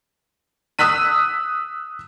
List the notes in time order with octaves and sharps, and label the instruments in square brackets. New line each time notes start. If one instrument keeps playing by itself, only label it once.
[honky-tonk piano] D#6 E6 F#6 B6 D#7